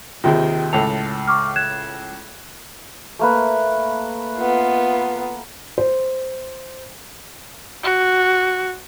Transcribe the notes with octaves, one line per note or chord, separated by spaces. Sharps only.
D#2 C3 D#3 F4 G#4
C#2 A2 A4 F7
C#6 D6 F6
F#6 G#6 E7
A3 A#3 B4
B3 F4
C5
F#4